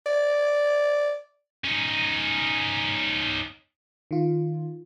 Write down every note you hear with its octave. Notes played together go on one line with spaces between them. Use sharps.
D5
C#4 D#4
D#3 F4